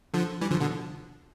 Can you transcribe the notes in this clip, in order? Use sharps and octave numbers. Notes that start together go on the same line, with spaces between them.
D3 F3
E3 G3
D3 F3
B2 D3